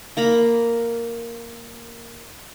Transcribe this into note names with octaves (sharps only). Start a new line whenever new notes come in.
A#3 A#5 B5